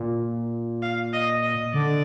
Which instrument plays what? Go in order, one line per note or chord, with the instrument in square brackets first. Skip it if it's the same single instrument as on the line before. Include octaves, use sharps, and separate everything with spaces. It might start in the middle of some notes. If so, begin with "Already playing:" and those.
Already playing: [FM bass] A#2
[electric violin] F5
D#5
D#5
[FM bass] D3 [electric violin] D5